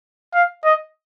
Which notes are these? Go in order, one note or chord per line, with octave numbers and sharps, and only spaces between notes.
F5
D#5